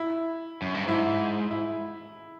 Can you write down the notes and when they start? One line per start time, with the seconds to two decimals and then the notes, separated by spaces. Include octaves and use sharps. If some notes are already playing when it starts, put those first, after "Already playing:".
Already playing: E4
0.62 F#2
0.74 G2
0.87 G#2 E4
1.51 E4